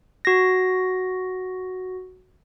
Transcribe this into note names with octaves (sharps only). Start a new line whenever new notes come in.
F#4 A#6